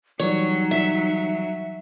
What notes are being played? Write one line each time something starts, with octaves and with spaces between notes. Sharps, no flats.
E3 F#3 G3 D#4 C#5
E5